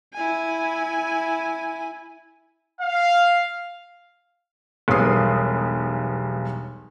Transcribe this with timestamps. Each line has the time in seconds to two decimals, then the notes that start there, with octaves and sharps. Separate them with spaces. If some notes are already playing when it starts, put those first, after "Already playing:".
0.14 E4 G#5
2.81 F5
4.88 E1 B1 G2 B4 D#6 C7